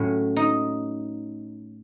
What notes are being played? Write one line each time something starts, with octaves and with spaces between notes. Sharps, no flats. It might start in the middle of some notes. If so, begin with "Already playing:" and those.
Already playing: A2 F#3 C#4
D#4